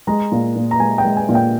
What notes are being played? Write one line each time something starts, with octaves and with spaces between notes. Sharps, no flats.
G#3 A#5
A#2
A#2
A#5
G#3 G#5
G5
G#3
G#5
A#2
G5